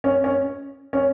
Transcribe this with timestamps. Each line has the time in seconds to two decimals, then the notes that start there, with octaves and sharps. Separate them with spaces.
0.04 C#4
0.24 C#4
0.93 C#4